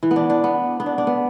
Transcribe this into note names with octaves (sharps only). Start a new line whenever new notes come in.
E3
B3
D4
D4
B3
B3
D4
D4
B3